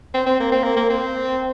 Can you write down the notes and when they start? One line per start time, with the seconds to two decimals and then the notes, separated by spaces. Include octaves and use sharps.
0.14 C4
0.26 C4
0.40 A#3
0.52 C4
0.64 A#3
0.76 A#3
0.90 C4